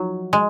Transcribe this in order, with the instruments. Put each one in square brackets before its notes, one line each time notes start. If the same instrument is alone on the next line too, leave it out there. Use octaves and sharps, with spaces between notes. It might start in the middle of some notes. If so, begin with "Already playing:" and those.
Already playing: [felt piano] F3 D#4 F#4 [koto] F#3
[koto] G#3